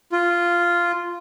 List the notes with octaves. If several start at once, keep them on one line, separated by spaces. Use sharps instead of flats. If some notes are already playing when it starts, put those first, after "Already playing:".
F4